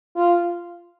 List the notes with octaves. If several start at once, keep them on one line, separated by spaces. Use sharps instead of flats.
F4